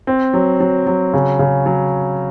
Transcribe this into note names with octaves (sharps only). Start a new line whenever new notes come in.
C4
F#3
F#3
F#3
C#3
C#3
F#3